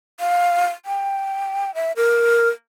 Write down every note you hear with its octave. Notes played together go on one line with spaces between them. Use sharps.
F5
G5
E5
A#4